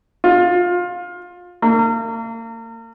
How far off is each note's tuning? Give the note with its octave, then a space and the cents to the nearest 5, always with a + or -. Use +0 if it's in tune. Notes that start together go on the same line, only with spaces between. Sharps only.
F4 +20
A#3 -40